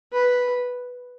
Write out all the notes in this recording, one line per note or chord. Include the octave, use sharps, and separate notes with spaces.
B4